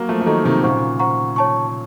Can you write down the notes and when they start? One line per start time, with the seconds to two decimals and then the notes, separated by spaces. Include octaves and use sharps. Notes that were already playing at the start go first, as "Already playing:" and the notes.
Already playing: F#3 A#3
0.09 F3 A3
0.21 A3
0.26 D#3 F#3 A4 D#5 A#5 C#6
0.45 C3 D#3
0.63 A#2 C#3 C5 F#5 A#5 C#6
0.99 C5 F#5 A#5 C#6
1.36 C#5 A5 C#6